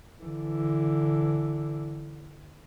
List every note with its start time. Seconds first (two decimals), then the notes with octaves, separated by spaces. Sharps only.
0.23 D3 E3